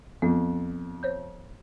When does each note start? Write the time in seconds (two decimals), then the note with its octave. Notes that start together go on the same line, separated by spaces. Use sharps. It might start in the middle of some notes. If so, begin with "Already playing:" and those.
0.22 F2 B3
1.03 C5 C#5 G6